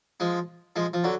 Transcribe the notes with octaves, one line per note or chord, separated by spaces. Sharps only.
F3 G#3
F3 G#3
F3
D3 F#3